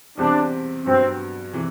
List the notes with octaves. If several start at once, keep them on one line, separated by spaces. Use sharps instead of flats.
E2 C3 G3 C4 D4 G4
G2 F#3 B3 C4
C3 E3